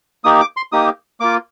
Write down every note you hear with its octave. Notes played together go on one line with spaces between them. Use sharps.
A#3 D#4 G4 D#6
D6
C6
A#3 D#4 G4 D#6
A#3 F4 D6